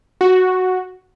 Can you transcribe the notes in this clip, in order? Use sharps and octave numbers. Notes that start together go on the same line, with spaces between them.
F#4